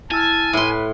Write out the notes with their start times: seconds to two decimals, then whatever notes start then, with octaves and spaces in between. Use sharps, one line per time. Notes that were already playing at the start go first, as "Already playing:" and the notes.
0.11 E4 G#5 A5 E6 F6
0.53 A2 B4 C6